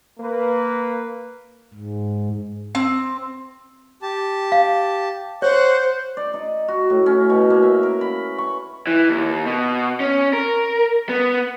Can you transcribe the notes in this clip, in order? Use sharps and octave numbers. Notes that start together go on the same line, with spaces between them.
A#3 B4
G#2
C4
G4 A5
F5
C5 C#5 F#5 C#6 F#6
D5
D#4
F#4
A2
C#4
B2
A#3
E5
A#4
B5
C#6
E3
D#2
B2
C#4
A#4
B3